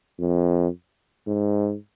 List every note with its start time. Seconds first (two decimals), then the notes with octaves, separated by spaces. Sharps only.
0.20 F2
1.27 G#2